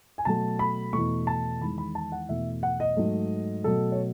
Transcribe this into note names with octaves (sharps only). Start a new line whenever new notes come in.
G#5
B2 F#3 A3 A5
B5
E2 B2 A3 C#6
A5
E2 D#3 G#3 B5
B5
A5
F#5
E2 B2 A3 E5
F#5
D#5
G#2 F#3 A3
B2 F#3 A3 A4
C#5